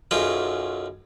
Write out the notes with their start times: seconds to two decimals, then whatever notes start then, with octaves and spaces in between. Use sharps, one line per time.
0.11 B1 F#2 F4 G#4 G5 A#5